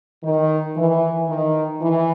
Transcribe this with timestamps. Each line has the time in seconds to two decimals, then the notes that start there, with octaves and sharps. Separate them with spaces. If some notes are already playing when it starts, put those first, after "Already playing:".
0.24 D#3
0.77 E3
1.29 D#3
1.82 E3